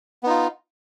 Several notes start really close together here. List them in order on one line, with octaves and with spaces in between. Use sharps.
B3 D#4 F4